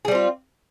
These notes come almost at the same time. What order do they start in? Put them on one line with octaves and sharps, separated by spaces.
G#4 G3 C4 F4